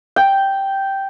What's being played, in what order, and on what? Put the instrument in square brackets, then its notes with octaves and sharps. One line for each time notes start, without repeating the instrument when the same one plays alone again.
[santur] G5